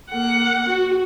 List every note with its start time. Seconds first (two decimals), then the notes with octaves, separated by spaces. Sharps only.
0.11 A#3 F#5
0.69 F#4